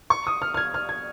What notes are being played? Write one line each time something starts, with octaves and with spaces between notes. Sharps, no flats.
C#6
D#6
F6
F6
G#6
F6
G#6